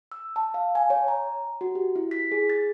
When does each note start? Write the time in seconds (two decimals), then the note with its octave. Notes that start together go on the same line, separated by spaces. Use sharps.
0.12 E6
0.36 A5
0.54 F5
0.75 G#5
0.90 C#5
1.08 A#5
1.61 F#4
1.75 G4
1.96 E4
2.11 B6
2.32 G#4
2.50 A6